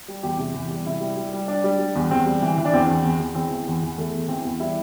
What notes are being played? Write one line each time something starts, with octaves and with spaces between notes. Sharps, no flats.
G3
E2 G4
C3
E2
G3
C3 E4
G3
G3
G3
G3 D4
G3
G3
E2
E2 C4
G3
E3
E3
D4
E2 C4
E2
E2
E2
E2 C4
E3
E2
E2
E2 A3
E2
E3 C4
E2
G3 E4